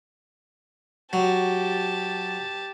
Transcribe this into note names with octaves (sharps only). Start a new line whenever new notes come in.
F#3 G4 A5